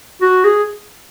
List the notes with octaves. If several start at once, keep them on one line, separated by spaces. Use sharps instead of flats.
F#4
G#4